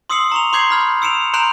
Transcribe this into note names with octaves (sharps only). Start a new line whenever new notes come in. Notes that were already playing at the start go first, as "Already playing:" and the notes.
C6 D#6 E6 C7 C#7 F#7
A#5 C#6 F7
C6 D6 G6 G#6 C7
B5 F6 G#6
E6 C#7 D7 E7 F7
A#5 C6 F#6 G6 D7 F7